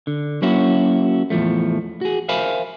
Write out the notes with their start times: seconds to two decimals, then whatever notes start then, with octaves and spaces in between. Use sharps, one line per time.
0.07 D3
0.42 F#3 A#3 C#4 E4 F#4
1.30 E2 A2 D#3 F3 A3
2.01 F#4 G#4
2.29 A#4 C5 E5 F5 G#5 B5